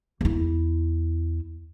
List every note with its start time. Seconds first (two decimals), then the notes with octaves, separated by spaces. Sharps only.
0.21 E2 E4